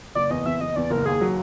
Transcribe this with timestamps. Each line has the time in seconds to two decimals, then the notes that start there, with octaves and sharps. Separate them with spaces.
0.15 F#1 D5
0.30 E2 D#5
0.45 E2 E5
0.61 E2 D#5
0.76 E2 D5
0.91 F#1 A#4
1.06 D#2 G#4
1.21 F#3